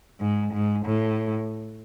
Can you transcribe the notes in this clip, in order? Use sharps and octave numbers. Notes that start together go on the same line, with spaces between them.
G#2
G#2
A2